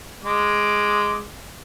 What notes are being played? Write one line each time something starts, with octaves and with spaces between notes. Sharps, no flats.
G#3 D6